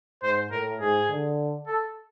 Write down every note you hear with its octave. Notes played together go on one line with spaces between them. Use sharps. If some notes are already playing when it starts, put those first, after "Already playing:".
G#2 C5
A2 A#4
G#2 G#4
D3
A4